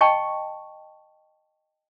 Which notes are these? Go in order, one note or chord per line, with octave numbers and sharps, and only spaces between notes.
D#5 G5 A5 C#6